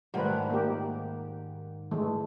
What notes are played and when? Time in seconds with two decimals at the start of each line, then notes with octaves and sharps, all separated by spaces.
0.14 G#2 D#3 G3 A3 B4
0.50 A#3 G4
1.91 E3 G#3 A3